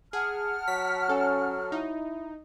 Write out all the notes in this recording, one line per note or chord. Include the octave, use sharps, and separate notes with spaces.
G#4 F#5 A5 F6
F#3 B6
C#4 A4
D#4 E4